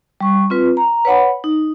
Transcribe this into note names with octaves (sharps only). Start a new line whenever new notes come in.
G3 C#6
C4 F4 B4
A#5
B4 C#5 F#5 B5
D#4